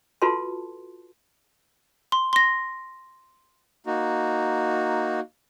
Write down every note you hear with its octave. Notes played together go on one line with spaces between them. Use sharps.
F4 F#4 A4 B4 A5 C6
C6
C6 A#6
A#3 D#4 F#4